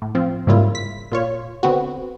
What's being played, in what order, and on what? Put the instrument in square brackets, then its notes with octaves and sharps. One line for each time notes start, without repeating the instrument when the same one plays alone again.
[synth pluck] A2
F3 C4
G#2 C#3 G3 A#3 E4 F4
B6
A#2 F4 C#5
D3 B3 C4 F#4